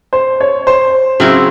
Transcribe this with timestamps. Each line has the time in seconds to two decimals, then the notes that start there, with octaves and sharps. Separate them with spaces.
0.13 C5
0.41 C#5
0.67 C5
1.20 C#3 F#3 C4 E4